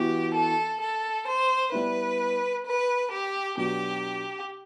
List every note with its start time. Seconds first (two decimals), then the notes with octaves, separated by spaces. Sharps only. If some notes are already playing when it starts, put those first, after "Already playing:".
Already playing: E3 B3 F#4 G4
0.34 A4
0.80 A4
1.26 C5
1.72 G3 B3 E4 B4
2.65 B4
3.10 G4
3.57 B2 F#3 B3 D4 F#4 G4